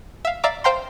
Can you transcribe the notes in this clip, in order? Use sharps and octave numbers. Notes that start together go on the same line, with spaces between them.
E5 F5
D5 E5 F5 A#5 D6
C5 F5 G5 A#5 C6